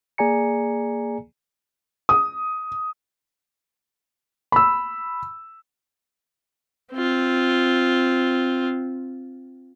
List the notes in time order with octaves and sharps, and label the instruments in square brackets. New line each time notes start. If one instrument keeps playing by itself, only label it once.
[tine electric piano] A#3 G#4 D5 G#5 A#5 C#7
[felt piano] D#6
B5 E6
[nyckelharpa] C4 F4